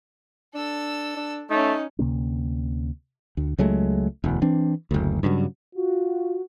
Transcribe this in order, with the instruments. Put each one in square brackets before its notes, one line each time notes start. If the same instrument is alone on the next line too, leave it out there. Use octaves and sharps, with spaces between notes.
[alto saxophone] D4 [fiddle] A4 E6
[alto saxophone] D4
[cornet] A3 [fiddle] C#4 C#5 [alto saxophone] D#4
[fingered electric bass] D2 C3 A#3 C#4
D2
C#2 F#3 G#3 A3
E1 D2
E3 C4 D4
F#1 D2
G2 C#3 F#3
[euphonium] F4 [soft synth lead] F#4